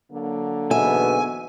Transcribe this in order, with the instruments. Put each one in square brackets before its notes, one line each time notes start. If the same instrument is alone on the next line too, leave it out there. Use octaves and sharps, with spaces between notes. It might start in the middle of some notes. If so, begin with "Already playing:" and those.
[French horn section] D3 F#3 A#3
[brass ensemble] E2 G#2 B2 [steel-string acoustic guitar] E5 [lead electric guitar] G#5